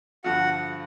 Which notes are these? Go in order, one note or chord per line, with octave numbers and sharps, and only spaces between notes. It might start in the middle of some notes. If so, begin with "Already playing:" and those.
G2 D3 F3 F#4 F#5